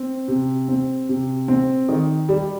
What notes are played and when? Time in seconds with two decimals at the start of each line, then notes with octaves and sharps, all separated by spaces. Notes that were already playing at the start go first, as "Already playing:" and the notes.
Already playing: C4
0.28 C3
0.68 C4
1.09 C3
1.48 C4
1.89 D#3
2.29 G3